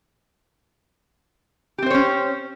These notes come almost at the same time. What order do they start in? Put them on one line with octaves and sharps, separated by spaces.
G4 C4 C5 C#5 C#4